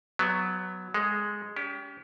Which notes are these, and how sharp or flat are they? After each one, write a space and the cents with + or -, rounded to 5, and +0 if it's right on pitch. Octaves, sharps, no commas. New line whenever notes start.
F#3 +0 B3 +10
G#3 +0 A4 +0
C#4 +40 G4 +0